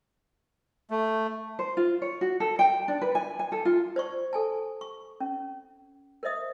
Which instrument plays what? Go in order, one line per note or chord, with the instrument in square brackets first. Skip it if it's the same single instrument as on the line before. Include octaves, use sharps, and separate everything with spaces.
[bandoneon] A3
[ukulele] C5
F4
C#5
F#4
A4
G5
D4
B4
G#5
G#5
A4
F4
[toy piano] C5 D5 C#6
A4 G#5 A5
C#6
C#4
A#4 C5 D#5 E5 D#6